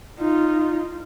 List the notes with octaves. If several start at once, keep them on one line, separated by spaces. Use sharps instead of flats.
D#4 F4